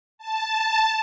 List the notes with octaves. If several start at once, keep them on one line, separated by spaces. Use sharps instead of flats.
A5